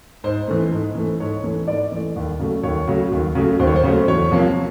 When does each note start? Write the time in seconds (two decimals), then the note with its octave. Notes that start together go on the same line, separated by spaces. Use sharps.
0.24 G#2 C5
0.47 E3 A3
0.72 G#2
0.95 E3 A3
1.20 G#2 C#5
1.44 E3 A3
1.68 G#2 D5
1.92 E3 A3
2.16 D#2
2.40 C#3 F#3 A3
2.63 D#2 C#5
2.88 C#3 F#3 A3
3.12 D#2
3.35 C#3 F#3 A3
3.59 D#2 C5
3.67 C#5
3.76 C5
3.83 C#3 F#3 A3
4.08 E2 C#5
4.31 C3 F3 A#3